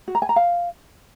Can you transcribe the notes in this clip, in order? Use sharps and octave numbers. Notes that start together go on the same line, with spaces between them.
F#4
A#5
G#5
A#5
F5